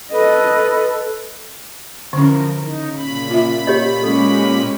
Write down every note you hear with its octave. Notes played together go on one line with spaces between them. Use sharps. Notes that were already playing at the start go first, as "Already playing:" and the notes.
A4 B4 D#5
D3 E3 F3 C#4 A#4
C#3 D#4
A#2 B5
F4 E5
G4 C#5 D#5
G#3 C#4 G4 A4